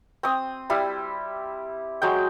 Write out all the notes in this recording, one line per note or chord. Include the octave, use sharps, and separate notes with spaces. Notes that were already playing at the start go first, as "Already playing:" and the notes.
C4 D#6
G3 E4
F#3 G#3 G5